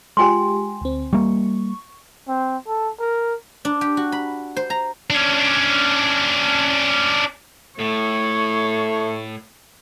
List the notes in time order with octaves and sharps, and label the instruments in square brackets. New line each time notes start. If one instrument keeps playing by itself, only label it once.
[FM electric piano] G#3 F4 G4 [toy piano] G5 G#5 C6
[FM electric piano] D2 C4
[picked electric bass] G3 A#3 [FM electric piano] C#6
[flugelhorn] C4
A4
A#4
[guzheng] D4
G4
F#4
B5
C5
A#5
[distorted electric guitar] C#4 D4
[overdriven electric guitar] A2 [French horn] A3 [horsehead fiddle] C#5